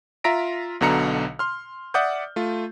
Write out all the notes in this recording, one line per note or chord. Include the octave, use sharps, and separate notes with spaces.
F4 E5 A#5 A#6 B6 D7
B1 B2 D3 A#5 C#7
C6 F6
D5 E5 F#5 D6 D#6 G6
A3 F4